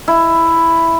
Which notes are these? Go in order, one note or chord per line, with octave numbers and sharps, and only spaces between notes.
E4